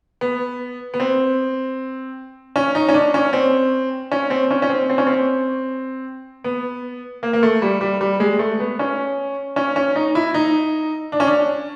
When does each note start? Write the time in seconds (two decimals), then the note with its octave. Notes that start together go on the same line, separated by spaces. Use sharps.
0.21 B3
0.94 B3
1.00 C4
2.56 C#4
2.75 D#4
2.89 C#4
2.94 D4
3.14 C#4
3.33 C4
4.12 C#4
4.30 C4
4.51 C#4
4.62 C#4
4.69 C4
4.89 C4
4.98 C#4
5.07 C4
6.44 B3
7.23 A#3
7.33 A#3
7.43 A3
7.62 G3
7.81 G3
8.01 G3
8.20 G#3
8.39 A3
8.60 B3
8.79 C#4
9.56 C#4
9.76 C#4
9.96 D#4
10.15 E4
10.34 D#4
11.12 D4
11.20 C#4
11.27 D4